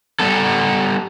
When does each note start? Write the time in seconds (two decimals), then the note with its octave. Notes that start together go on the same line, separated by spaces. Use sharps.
0.20 G3 B3 A4